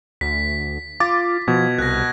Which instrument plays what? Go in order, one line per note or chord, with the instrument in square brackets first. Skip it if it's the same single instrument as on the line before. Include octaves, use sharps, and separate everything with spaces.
[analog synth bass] D2 [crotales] B6
[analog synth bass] F4 [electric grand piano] D6 A6
[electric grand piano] B2 [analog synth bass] F3 [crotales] G#6
[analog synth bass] C2 [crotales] F#6 A#6